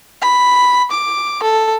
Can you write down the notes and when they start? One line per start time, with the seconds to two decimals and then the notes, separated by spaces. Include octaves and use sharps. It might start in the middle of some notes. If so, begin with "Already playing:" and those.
0.21 B5
0.91 D6
1.43 A4